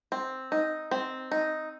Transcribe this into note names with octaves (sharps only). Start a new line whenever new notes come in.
C4
D#4
C4
D#4